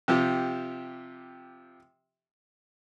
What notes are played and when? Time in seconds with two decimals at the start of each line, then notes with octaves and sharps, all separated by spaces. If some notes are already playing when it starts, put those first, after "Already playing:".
0.08 C3 F3 G4